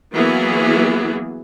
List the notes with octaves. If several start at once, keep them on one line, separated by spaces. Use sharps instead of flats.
E3 F#3 A#3 B3 G#4